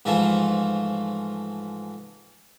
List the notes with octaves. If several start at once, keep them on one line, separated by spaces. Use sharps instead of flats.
G#2 E3 F3 A3 F4